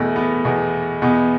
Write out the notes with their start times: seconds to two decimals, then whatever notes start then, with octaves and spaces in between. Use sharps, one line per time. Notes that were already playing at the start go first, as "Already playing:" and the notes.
Already playing: E2 B2 A3
0.16 B3
0.45 E2 B2
1.02 E2 B2 B3